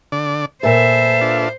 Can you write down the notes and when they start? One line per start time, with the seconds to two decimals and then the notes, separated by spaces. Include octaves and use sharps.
0.12 D3 D5
0.63 A#2 A4 B4 C5 E5
1.21 D4 F4 A4